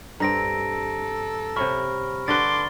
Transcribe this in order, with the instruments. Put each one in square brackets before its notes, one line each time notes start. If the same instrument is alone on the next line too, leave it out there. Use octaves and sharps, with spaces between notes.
[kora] G2 C4 [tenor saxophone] A4 [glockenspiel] A#5 A#6 D7
[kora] C3 C#5 E5 [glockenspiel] B5 C#6 F6
[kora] D3 B4 [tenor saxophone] A4 [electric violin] C6 D6 [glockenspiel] A6 G7